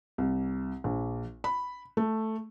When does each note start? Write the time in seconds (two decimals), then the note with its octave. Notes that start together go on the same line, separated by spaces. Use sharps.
0.18 C2
0.84 A#1
1.44 B5
1.97 A3